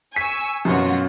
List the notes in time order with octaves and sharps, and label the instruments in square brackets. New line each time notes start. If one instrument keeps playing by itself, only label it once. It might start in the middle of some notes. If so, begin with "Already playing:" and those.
[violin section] G#5 C#6 E6 [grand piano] B6
[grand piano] F#2 B2 C#4 [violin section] F4 F#4